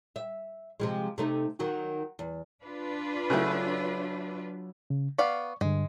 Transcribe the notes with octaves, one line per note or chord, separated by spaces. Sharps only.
E5
C3 F3 G#3
C3 A3 D#4
D#3 F#3 F#4
E2
D4 F4 B4
C#3 F#3 A3 E4 F#6
C#3
B3 D5 F5 C#6
G2 D3 G#3